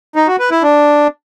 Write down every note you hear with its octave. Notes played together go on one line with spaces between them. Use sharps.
D#4
F#4
B4
E4
D4